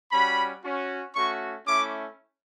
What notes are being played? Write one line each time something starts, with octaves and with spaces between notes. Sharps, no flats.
G3 C#4 F#4 B5
C#4 F#4
A3 C#4 F#4 C#6
A3 C#4 E4 D6